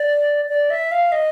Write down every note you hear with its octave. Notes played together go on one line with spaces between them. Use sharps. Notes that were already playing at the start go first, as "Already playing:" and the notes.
Already playing: D5
D5
E5
F5
D#5